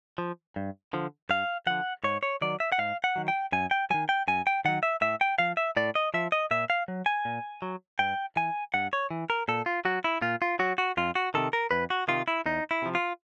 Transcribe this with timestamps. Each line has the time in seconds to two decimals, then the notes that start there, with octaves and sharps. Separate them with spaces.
0.18 F3
0.56 G2
0.93 D3 F3
1.29 G2 F5
1.67 D3 F3 F#5
2.04 G#2 C#5
2.23 C#5
2.41 D#3 F#3 D5
2.60 E5
2.72 F#5
2.79 G#2 F5
3.04 F#5
3.16 D#3 F#3
3.28 G5
3.52 F#2 G#5
3.71 G5
3.90 D#3 F#3 G#5
4.09 G5
4.28 F#2 G#5
4.47 G5
4.65 D#3 F#3 F#5
4.83 E5
5.01 A2 E5
5.21 G5
5.38 F3 F5
5.57 E5
5.77 A2 D5
5.95 D#5
6.14 F3 E5
6.32 D#5
6.51 A#2 E5
6.70 F5
6.88 F#3
7.06 G#5
7.25 A#2
7.62 F#3
7.99 G2 G5
8.36 E3 G#5
8.74 G2 F#5
8.93 C#5
9.11 E3
9.30 A#4
9.48 A#2 A4
9.66 F4
9.85 F#3 F#4
10.04 E4
10.22 A#2 F4
10.42 F4
10.59 F#3 F#4
10.78 F#4
10.97 F2 F4
11.15 F#4
11.34 C3 D#3 A4
11.53 A#4
11.71 F2 B4
11.90 F#4
12.08 C3 D#3 F4
12.28 E4
12.46 E2 D#4
12.71 E4
12.82 C3 F3
12.95 F4